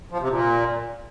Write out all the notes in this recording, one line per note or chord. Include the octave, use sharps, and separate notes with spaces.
F3
C3
A#2